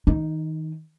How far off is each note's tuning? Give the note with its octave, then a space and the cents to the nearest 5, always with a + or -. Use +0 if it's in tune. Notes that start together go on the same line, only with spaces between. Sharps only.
D#3 +30 D#4 +0